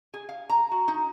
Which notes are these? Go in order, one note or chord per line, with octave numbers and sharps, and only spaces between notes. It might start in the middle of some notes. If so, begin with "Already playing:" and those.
G#4
F5
A#5
F#4
D#4